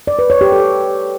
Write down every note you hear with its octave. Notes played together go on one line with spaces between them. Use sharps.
D5
B4
C#5
G4
A4